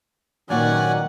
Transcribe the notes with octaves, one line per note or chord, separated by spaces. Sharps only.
G2 A#2 D#3 F#3 C#4 D5 F#5 G#5